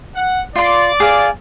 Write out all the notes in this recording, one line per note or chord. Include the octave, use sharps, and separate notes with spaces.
F#5
F4 D5 C6
G#4 F5